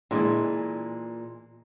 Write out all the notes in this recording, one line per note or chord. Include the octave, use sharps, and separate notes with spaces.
A#2 D3 E3 G#3